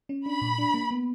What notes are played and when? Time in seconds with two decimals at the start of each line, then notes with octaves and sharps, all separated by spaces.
0.09 C#4
0.26 D4 B5
0.42 A#2
0.58 D4
0.74 A#3
0.91 B3